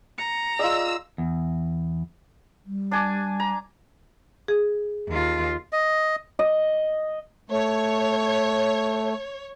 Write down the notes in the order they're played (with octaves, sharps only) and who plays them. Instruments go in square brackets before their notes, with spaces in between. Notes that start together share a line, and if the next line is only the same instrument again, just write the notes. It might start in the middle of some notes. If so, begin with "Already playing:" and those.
[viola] A#5 [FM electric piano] C#7
[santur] F4 G#4 [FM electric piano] D5 D#5 [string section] E6
[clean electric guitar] E2
[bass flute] G3
[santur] D4 G#5 D6
A#5
[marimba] G#4
[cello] D#2 F4
[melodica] D#5
[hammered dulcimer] D#5
[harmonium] A3 [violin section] C#5